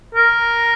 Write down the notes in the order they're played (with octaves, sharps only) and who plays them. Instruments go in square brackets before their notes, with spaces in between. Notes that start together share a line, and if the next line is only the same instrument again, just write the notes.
[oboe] A#4